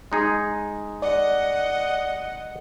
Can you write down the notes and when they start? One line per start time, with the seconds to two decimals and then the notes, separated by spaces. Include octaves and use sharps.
0.12 G#3 D#4 G#4
1.02 D5 D#5 F#5